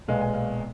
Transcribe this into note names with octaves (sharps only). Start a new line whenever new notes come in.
B1 A#2 G#3 B3 F5
G#5
F5